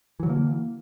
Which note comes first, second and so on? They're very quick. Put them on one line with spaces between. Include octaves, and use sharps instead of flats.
E3 F#3 D3 A#3